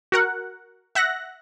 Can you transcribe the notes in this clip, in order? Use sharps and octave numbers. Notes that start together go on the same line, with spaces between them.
F#4 A#4 F#5
E5 F#5 F#6 A#6